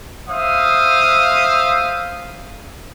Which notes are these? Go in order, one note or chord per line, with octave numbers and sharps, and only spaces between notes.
C5 E5 F5 D#6